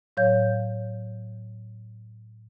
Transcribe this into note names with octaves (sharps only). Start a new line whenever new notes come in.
A2 F#3 C#5 F5 G6